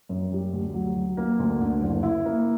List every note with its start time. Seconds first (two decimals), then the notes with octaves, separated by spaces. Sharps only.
0.09 F#2
0.32 G3
0.53 D2
0.74 F#3
0.95 F#3
1.17 A#3
1.39 D2
1.60 D3
1.82 F#1
2.03 E4
2.25 A#3